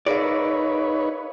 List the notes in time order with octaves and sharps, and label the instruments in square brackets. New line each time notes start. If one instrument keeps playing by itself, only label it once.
[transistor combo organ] D#4 B4 C#5 [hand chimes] G#4 A#4 F5 [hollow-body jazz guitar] D5